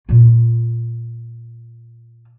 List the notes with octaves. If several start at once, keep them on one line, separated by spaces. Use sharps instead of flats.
A#2 F4